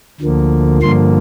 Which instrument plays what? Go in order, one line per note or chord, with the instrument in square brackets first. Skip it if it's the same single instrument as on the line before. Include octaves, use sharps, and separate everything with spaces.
[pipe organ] D2 D3 F3 A#3
G2 D3 F3 A#3 C6